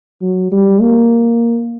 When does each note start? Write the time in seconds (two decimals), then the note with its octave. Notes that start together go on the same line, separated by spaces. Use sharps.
0.22 F#3
0.52 G3
0.81 A#3